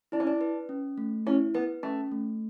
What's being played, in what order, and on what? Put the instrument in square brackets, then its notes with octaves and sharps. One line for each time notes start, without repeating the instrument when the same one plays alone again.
[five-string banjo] D4 [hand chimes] E4
[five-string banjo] C#4
D4
[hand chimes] B4
C#4
A3
[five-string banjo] C#4 [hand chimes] E4
[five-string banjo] B3 [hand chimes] B4
[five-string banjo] A3 [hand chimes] C#4
[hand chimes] A3